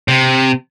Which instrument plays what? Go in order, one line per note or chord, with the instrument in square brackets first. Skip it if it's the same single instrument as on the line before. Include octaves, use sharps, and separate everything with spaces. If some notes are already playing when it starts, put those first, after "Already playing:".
[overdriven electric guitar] C3